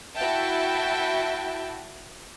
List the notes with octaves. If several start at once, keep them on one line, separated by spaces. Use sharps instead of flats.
E4 F#4 E5 G5 A5